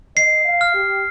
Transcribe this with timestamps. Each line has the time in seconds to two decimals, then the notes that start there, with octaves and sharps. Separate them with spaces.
0.17 D#5 C7
0.45 F5
0.61 F6
0.74 G4